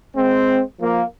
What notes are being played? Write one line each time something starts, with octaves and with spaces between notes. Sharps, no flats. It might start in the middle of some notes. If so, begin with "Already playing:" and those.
G#3 C4
F3 A#3